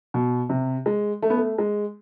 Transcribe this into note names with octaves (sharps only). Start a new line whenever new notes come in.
B2
C3
G#3
A3
B3
A3
G#3